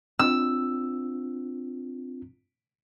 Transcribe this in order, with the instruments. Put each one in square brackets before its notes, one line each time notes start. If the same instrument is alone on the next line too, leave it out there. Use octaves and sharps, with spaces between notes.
[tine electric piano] C4 D4 F4 [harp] E6